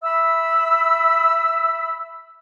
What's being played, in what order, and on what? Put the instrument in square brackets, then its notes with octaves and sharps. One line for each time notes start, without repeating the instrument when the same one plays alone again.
[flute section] E5 B5 E6